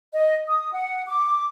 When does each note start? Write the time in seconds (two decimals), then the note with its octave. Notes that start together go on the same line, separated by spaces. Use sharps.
0.14 D#5
0.48 D#6
0.73 F#5
1.08 D6